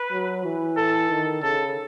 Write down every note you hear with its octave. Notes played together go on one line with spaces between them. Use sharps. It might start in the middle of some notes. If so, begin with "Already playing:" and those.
Already playing: B4
F#3
E3
A4
D#3
C#3 A4